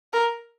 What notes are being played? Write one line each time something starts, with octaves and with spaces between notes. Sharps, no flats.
A#4